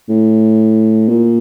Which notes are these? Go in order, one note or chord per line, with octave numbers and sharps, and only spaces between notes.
A2
A#2